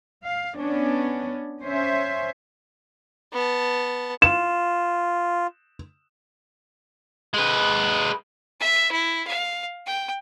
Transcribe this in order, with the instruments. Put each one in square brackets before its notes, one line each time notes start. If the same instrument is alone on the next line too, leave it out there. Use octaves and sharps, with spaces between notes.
[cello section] F5
B3 C#4 D4
C#4 C5 E5
[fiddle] B3 A5
[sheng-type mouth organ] F4 [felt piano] E7
[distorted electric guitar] G#3 B4
[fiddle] E5
E4
F5
G5